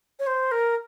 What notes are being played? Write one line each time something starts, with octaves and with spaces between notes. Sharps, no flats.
C#5
C5
A#4